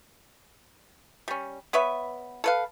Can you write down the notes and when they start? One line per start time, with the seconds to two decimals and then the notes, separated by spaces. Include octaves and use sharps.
1.28 G3 C#4
1.73 B3 B4 C#5 E5
2.44 A4 B4 F5